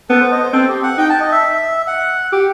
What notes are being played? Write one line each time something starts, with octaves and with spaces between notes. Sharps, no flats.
B3 A4
C5
D#5
C5
C4 A4
G4
F#5
D#4 G5
A5
D#5
E5
F#5
G4